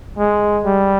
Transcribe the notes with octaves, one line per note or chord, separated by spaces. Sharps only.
G#3
G3